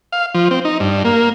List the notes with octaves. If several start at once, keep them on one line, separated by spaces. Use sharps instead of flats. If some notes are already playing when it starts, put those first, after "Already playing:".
F5
F3
C4
D#4
G2
A#3